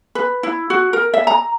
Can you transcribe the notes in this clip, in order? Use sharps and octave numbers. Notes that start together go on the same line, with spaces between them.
B4
E4
F#4
A#4
E5
A#5